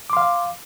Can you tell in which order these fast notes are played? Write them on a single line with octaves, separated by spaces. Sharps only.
D6 C6 F5